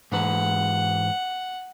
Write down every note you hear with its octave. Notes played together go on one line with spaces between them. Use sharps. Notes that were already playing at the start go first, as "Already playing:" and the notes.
G#2 E3 B4 F#5